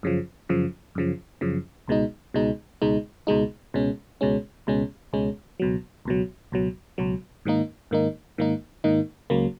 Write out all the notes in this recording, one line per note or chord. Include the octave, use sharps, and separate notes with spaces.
F#2 C#3 F3
F#2 C#3 F3
F#2 C#3 F3
F#2 C#3 F3
C#2 B2 G#3 D#4
C#2 B2 G#3 D#4
C#2 B2 G#3 D#4
C#2 B2 G#3 D#4
C#2 B2 G#3 C#4
C#2 B2 G#3 C#4
C#2 B2 G#3 C#4
C#2 B2 G#3 C#4
C#2 B2 F#3
C#2 B2 F#3
C#2 B2 F#3
C#2 B2 F#3
G#2 D#3 A#3 D#4
G#2 D#3 A#3 D#4
G#2 D#3 A#3 D#4
G#2 D#3 A#3 D#4
C#2 C#3 F#3 A#3